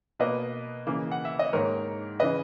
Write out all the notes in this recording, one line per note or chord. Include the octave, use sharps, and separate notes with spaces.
B2 A#3 B4 D#5
C#3 E3 A#3
F#5
E5
D#5
G#2 D#3 A#3 A#4 C#5
C#3 E3 B4 D#5